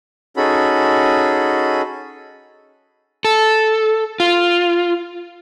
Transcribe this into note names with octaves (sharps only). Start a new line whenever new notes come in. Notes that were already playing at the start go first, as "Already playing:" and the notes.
C#4 D#4 F#4 G#4 A4 B5
A4
F4